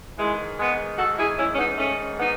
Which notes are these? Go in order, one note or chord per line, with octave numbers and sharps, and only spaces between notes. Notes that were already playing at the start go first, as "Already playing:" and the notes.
G#2 D#3 E3 G#3
G#3 B3
F#4 A4
E4 G#4
C#4 E4
C#4
B3 D#4
A3 C#4
B3 D#4